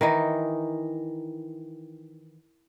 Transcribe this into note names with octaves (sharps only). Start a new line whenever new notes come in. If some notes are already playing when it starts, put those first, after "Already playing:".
D#3 E3 D#4